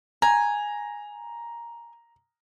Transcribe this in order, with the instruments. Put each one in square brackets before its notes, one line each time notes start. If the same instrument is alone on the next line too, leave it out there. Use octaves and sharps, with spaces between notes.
[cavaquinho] G#5 [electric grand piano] A#5